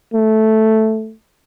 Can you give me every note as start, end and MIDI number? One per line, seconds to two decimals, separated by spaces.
0.14 1.13 57